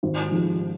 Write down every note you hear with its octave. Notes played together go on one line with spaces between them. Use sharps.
G#1
G#2 F3